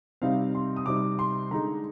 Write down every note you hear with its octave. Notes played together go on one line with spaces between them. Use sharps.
C3 G3 C4 D#4 F5
C6
D#6
C3 G3 C4 D#4 D6
C6
D3 G#3 D#4 A#5